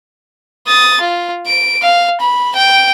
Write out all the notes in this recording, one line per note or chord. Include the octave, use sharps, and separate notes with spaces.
D#6 A6
F4
D7
F5
B5
G5 D7